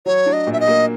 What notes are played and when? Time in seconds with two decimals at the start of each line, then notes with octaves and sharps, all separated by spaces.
0.06 F#3 C#5
0.26 D4
0.33 D#5
0.47 A#2
0.53 E5
0.60 D#5
0.68 A#3